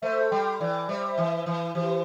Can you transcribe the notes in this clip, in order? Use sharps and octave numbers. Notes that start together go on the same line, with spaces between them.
A3 C5 E5
G3 G5 C6
E3 D5 G5
D5
G3 C5 E5
E3
E3
E3 G4 C5